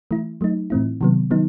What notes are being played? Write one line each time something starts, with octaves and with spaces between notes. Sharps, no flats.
E3 A3 E4
F#3 A3 D#4
A2 E3 A3 C4 E4
C3 D#3 F#3 B3
D#3 F#3 B3 D#4